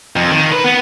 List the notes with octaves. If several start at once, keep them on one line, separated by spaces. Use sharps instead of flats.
F2
D#3
B4
B3